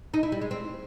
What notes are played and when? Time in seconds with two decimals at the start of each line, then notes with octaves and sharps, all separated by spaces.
0.14 D#4
0.23 E4
0.32 G3
0.42 G#3
0.51 C4